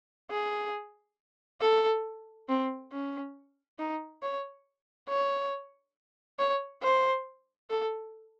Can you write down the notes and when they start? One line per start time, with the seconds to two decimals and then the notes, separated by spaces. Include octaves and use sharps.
0.31 G#4
1.61 A4
2.49 C4
2.92 C#4
3.79 D#4
4.23 C#5
5.08 C#5
6.39 C#5
6.83 C5
7.70 A4